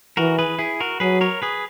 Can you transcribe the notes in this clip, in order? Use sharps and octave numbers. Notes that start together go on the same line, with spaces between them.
E3 F#4 A#4
G#4 B4
E4 G#4
F#4 A#4
F#3 G#4 B4
A#4 C#5
G#4 B4